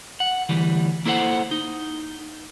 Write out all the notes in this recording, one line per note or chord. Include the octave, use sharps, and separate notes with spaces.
F#5
D2 E3 G3
A#3 E4 A4 C5 F#5
D#4